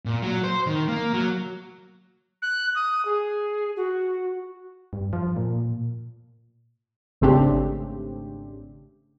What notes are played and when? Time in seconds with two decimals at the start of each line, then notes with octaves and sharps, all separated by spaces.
0.06 A#2
0.22 F#3
0.44 C5
0.67 D#3
0.88 A#3
1.13 F#3
2.42 F#6
2.75 D#6
3.05 G#4
3.76 F#4
4.93 G2
5.13 F3
5.36 A#2
7.21 G#1 C#3 A3 C4 D4 G4